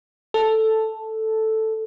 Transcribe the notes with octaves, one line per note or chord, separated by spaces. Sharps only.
A4